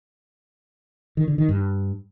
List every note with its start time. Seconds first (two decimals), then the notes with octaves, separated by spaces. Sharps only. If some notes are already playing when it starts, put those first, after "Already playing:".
1.17 D#3
1.28 D3
1.38 D#3
1.49 G2